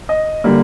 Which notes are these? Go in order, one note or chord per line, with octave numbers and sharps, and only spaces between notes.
D#5
D3 G3 A#3